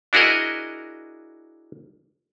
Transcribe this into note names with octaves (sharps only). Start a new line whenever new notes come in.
D4 E4 F#4 G#4 A#4 D#5